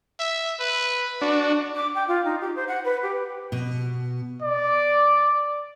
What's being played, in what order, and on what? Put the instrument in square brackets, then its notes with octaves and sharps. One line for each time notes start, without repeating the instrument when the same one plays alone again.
[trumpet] E5
B4
[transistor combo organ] D4 [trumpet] F#4
[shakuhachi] D6
G5
F4
D#4
G4
C5
F#5
B4
G4
[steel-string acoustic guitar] B2
[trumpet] D5